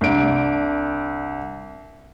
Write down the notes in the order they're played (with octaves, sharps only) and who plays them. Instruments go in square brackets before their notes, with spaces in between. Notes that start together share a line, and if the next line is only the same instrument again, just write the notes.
[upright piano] C2 D4 D7